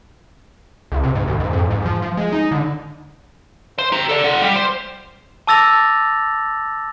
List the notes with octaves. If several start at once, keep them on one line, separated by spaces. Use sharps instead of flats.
C#2
C3
G#2
D#2
G#2
F2
G#2
F3
F3
G#3
D#4
D3
C5
G4 A#5
A4 D5
F4 F#5
G3
C5
A5 D6 E6 A6 A#6 F7